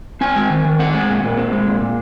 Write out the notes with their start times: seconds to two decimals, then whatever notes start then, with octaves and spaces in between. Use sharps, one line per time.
0.21 C4 G#5
0.36 G#3
0.50 D#3
0.65 D#3
0.79 C4 F#5
0.94 G#3
1.09 A#2
1.23 A#2
1.37 C4
1.52 G#3
1.67 A#2
1.81 A#2